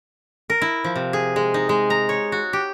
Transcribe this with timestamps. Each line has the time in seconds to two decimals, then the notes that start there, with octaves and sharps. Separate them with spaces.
0.50 A#4
0.61 E4
0.84 F3
0.96 C3
1.13 G#4
1.36 G#3
1.54 D#4
1.69 G#3
1.90 A#5
2.09 C#5
2.32 F#4
2.53 G4